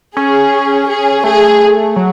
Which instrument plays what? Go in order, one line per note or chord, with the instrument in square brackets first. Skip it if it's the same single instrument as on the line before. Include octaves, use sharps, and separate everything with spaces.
[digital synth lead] C#4 [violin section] G#4
[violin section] G#4
[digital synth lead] A3 [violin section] G#4
[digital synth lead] F#3